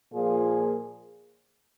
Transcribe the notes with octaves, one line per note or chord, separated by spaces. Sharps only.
A#2 F3 A#3 F4 G#4